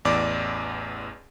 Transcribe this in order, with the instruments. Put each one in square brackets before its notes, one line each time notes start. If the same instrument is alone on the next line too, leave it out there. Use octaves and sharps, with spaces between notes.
[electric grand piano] A1 E2 D5 D6